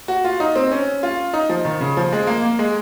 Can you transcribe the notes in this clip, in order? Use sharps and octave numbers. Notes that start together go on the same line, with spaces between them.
F#4
F4
D#4
C4
C#4
F4
D#4
F3
D#3
C#3
F3
G#3
A#3
A#3
G#3